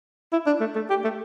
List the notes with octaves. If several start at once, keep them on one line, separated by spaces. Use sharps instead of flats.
E4
D4
A3
A3
G4
A3